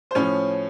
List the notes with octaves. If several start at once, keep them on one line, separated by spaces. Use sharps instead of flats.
C5
A2 F3 C#4 C#5